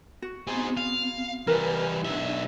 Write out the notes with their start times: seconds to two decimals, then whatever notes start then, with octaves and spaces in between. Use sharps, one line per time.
0.22 F#4
0.47 B3 C4 G#4 C5
0.77 F5
1.47 E3 G3 A#4 B4 G#5
2.05 B1 D4 E5